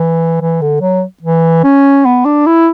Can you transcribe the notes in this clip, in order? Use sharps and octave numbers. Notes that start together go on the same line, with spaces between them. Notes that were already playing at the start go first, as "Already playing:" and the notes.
Already playing: E3
E3
D3
F#3
E3
C#4
B3
D4
E4